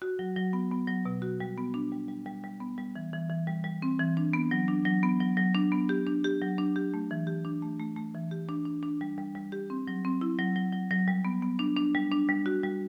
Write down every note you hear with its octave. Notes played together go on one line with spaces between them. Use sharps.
F#4
F#3
F#3
B3
B3
F#3
B2
F#4
G3
B3
D4
G3
G3
G3
G3
B3
G3
E3
E3
E3
G3
G3
C4
E3
D4
B3
F#3
D4
F#3
B3
F#3
F#3
D4
B3
G4
D4
G4
F#3
D4
G4
A3
E3
G4
D4
A3
A3
A3
E3
G4
D4
D4
D4
G3
G3
G3
G4
C4
F#3
C4
E4
F#3
F#3
F#3
F#3
G3
B3
B3
D4
D4
G3
D4
G3
F#4
G3